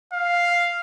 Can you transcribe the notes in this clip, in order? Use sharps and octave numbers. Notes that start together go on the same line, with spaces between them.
F5